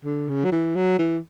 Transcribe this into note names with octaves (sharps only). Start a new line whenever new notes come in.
D3
C#3
F#3
E3
F#3
E3